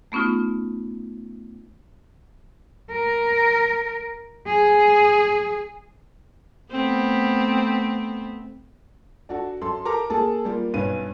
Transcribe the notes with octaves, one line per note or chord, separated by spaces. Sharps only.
A3 B3 C#4 D#4 F4
A#4
G#4
A3 B3 C4
D4 F#4 A4
F#2 A4 C6
G4 A4 A#4 A#5 D6
A#3 G#4 A4 A5
G3 A#3 F4
B1 G2 C#4 B4 D#7